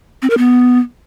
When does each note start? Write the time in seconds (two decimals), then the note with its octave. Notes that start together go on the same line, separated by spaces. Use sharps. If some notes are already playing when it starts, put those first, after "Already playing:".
0.22 C4
0.30 A#4
0.38 B3